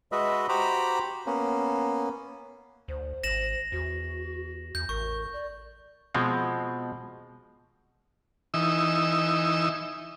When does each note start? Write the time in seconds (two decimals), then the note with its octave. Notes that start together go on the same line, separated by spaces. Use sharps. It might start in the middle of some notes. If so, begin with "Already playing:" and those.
0.12 G#3 F#4 B4 D#5 E5
0.49 F#4 G4 C5 A#5 B5 D6
1.26 A#3 B3 C#4
2.88 D2 C5
3.24 G#1 A#6 E7 F#7
3.72 E2 F#4
4.75 E2 G6
4.89 A1 A#4 C#6
5.33 D5
6.15 B2 F3 G#3 C4
8.54 E3 D#4 E6